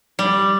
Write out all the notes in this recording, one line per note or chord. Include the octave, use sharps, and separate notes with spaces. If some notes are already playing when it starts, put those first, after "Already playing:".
G3